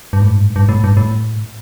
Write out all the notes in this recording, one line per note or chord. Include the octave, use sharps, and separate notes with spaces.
G2
A2
G2
A2
G2
A2
G2
A2